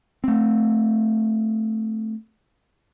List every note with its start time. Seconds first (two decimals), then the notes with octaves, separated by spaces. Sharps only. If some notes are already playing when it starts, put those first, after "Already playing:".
0.24 A3 C4